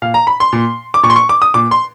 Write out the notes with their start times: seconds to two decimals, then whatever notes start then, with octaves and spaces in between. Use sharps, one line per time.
0.02 A#2 F5
0.14 A#5
0.27 B5
0.40 C6
0.53 A#2
0.94 D6
1.03 A#2 C#6
1.10 C6
1.16 C#6
1.29 D6
1.42 D#6
1.54 A#2 D6
1.71 C6